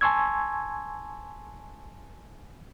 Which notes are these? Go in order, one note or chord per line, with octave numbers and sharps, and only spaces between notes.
G#5 A5 C6 C#6 E6 G#6